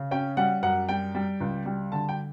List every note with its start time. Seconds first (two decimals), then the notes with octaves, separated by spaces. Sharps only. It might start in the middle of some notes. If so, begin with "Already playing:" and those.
Already playing: C#3
0.11 C#4 G5
0.37 G3 F#5
0.63 F#2 F#5
0.89 G3 G5
1.15 G3
1.40 C#2
1.66 G3
1.92 D3 A5
2.09 G5